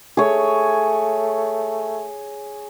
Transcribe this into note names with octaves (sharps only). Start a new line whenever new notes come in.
A3 G#4 C#5